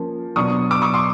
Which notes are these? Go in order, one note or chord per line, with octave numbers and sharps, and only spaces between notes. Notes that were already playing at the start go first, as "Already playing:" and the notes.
Already playing: F3 A#3 C#4
B2 F#3 B3 D4 C#6 D#6
D6 E6
C#6 D#6
C6 D6